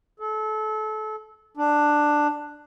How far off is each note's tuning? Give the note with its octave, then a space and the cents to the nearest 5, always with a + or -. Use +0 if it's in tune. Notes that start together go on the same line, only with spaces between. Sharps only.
A4 -30
D4 +10